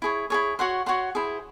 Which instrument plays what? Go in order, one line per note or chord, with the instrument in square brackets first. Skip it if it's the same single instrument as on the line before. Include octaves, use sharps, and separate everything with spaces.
[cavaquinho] E4 G#4 C#5
E4 G#4 C#5
F#4 C#5 F#5 C6
F#4 C#5 F#5 C6
E4 G#4 C5